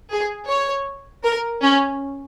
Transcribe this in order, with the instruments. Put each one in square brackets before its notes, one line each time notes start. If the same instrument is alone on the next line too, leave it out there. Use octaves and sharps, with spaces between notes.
[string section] G#4
C#5
A#4
C#4